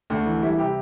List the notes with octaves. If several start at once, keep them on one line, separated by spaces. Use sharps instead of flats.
D2 D4
E3
G3 E4
C3 G4